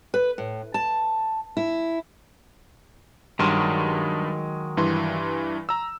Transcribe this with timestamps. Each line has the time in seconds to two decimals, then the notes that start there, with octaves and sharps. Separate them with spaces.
0.14 B4
0.38 A2
0.74 A5
1.57 E4
3.39 G2 D#3 F#3 G#3 C6 F6
4.77 G2 E3 C6
5.69 A#5 E6